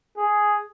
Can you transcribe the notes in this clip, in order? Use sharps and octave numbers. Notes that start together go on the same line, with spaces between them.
G#4